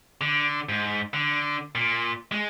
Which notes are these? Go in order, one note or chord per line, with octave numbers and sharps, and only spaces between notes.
D3
G#2
D3
A#2
G#3